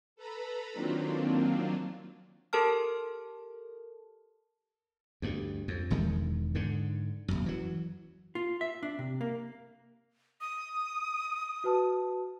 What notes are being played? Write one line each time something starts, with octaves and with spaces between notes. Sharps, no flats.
A4 B4 A#5 B5
D#3 F#3 A#3 C4 D4 F4
G4 A4 A#4 A5 F6
D2 G2
F2
E1 E2 D#3 G#3
G#2 D3
D#1 G#1 F#2
E3 F#3
F4
E5
D4
C3
A#3
D#6
F#4 B4 A5